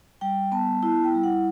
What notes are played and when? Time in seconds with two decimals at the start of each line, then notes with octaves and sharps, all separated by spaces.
0.21 G3 G5
0.52 B3 A5
0.83 E4 A5
1.04 G5
1.14 G3
1.23 F#5